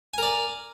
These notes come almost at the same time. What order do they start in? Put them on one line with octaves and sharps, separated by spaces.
G#5 A#4 D5